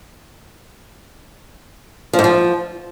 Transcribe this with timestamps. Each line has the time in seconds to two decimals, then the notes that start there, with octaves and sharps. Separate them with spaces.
2.13 F3
2.19 G#2
2.24 F3